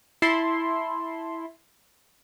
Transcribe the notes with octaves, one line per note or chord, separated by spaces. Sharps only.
E4 A5 C6